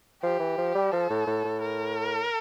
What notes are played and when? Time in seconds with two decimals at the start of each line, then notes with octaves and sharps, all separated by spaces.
0.22 F3 G4
0.39 E3
0.58 F3
0.75 G3
0.92 F3 A4
1.10 A2
1.27 A2
1.44 A2
1.62 A#4